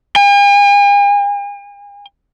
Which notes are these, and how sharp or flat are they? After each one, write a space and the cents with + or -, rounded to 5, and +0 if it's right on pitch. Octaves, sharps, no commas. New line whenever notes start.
G#5 -45